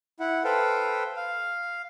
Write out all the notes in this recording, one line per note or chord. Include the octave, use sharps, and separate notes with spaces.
E4 F#5
A4 B4 C5 F5 G5
F5